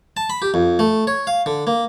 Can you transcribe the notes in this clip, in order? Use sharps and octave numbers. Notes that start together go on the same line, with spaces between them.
A5
B5
G4
F2
A3
C#5
F5
D3
A#3